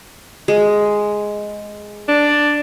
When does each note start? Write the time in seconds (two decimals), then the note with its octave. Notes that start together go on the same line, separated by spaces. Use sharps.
0.48 G#3
2.09 D4